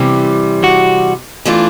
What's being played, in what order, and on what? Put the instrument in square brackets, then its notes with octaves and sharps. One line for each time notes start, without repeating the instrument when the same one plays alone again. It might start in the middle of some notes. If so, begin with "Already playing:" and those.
Already playing: [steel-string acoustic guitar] C3 E3 G3
[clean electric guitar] F#4
[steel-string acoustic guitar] E3 A3 D4 F4